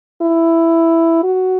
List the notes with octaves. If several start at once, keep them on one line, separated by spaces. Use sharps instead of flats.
E4
F#4